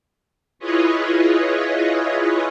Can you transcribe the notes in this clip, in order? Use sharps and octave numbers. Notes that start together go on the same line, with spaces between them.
E4 F4 G#4 B4 C#5 D#5